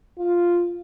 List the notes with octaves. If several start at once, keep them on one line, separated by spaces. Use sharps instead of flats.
F4